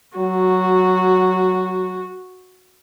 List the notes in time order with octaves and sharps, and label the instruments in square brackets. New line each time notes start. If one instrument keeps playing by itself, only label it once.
[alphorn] F#3 [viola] F#4